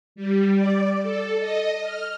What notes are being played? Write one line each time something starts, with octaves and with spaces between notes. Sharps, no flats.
G3
D5
A4
D#5
F6